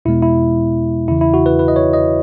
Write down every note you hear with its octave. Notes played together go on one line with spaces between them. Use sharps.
E2 B2 G#3 B3 E4
E4
E2 C#3 E3 E4
E4
F#4
B4
B4
D#5
C#5
D#5